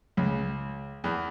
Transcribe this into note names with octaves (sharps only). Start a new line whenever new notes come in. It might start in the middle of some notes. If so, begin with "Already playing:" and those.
C#2
E2